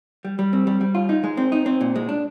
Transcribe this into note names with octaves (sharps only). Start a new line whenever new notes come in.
G3
G3
C4
G3
G3
F4
D#4
G#3
C4
D#4
C4
A#2
G#3
D4